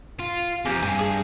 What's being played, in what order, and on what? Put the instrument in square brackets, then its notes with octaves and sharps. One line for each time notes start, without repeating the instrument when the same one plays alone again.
[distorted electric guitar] F4
[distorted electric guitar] F2 C3 [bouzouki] A#3 G4 G#5
[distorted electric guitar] G2 [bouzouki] G#5
[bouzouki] G#4